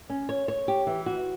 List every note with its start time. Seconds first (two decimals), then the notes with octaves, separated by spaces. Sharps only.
0.10 C#4
0.29 C#5
0.48 C#5
0.68 G4
0.87 E3
1.06 F#4